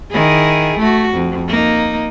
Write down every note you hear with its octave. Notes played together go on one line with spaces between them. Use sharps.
D#3 E4 G#4
A3 F#4
F2
A#3 D#4